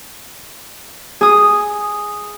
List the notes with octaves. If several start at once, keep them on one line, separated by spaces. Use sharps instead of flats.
G#4 D#6